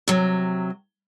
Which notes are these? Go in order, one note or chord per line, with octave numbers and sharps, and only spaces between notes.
C3 F#3